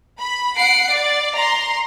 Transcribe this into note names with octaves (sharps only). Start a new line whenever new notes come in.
B5
F#5 C7 D7
D5
A#5 C6